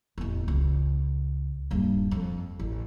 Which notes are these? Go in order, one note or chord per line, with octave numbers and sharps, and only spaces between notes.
E1 A1
C#2
D#1 G2
F2
A1